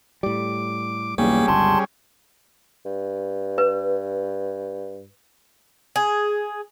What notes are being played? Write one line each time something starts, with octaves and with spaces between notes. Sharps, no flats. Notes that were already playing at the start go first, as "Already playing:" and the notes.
A2 G3 D6
B1 E2 G3 A#3 C#4 G#4
G1 C#2 C#3 A5 C6
G2
B4
G#4